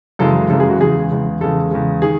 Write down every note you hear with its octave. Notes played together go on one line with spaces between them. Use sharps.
F#2 C#3 E3 G#3 A4
F#2 C#3 E3 G#3 A4
G#4
F#4
E2 C#3 G#3 G#4
E2 C#3 G#3
E2 C#3 G#3 A4
E2 C#3 G#3
D#3 G#4